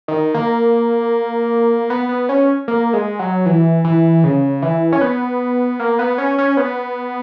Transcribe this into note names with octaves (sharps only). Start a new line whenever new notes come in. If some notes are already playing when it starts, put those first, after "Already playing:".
D#3
A#3
B3
B3
C#4
A#3
G#3
F#3
E3
E3
C#3
E3
C#4
B3
A#3
B3
C#4
C#4
B3